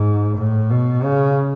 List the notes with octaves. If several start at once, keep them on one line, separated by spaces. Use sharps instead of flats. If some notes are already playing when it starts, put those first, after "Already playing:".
Already playing: G#2
A2
B2
C#3